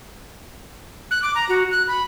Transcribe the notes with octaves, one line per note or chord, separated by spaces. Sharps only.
F#6
D6
A#5
F#4
F#6
B5